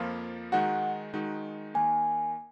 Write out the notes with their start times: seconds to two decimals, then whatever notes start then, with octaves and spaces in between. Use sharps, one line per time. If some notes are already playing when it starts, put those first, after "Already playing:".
Already playing: F2 F3 A#3 F4
0.52 D#3 G#3 D#4 F#4 F#5
1.14 D#3 G#3 D#4 F#4
1.74 D#3 A#3 G#5